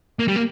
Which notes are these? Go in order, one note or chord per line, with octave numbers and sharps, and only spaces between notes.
A#3
G3
A#3